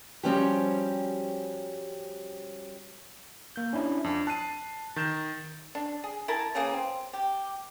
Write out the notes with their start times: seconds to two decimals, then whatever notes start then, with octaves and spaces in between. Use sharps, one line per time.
0.23 F3 G3 C4 C#4 F#4 G4
3.56 A#3 G6
3.73 C#4 D4 E4
4.04 F2 D4
4.27 A5 F#6 C7 D#7
4.96 D#3 G6 A6 E7
5.75 D4
6.04 G#4
6.28 E4 A#4 A5
6.55 C#3 E3 A#3 G#4
6.74 C4
7.13 G4